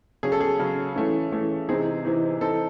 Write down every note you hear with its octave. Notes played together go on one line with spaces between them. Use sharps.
C#3 F#3 C#4 G#4
A4
G#4
C#3 F#3 C#4
E3 A3 C#4
E3 A3 C#4
C3 E3 C4 D#4 G#4
C3 E3 C4 D#4
E3 C4 D#4 A4